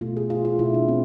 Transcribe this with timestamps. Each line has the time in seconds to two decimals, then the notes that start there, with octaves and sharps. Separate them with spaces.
0.01 B2 A3 F4
0.17 G#4
0.30 F4
0.45 F4
0.59 B2 A3 E4
0.74 D4
0.89 C4